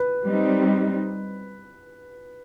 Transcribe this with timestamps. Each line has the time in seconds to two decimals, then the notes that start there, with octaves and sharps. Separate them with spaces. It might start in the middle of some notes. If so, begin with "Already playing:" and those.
Already playing: B4
0.25 G3 C4 D#4